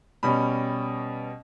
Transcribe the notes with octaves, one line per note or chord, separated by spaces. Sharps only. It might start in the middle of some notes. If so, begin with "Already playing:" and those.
B2 G3 C#4 B5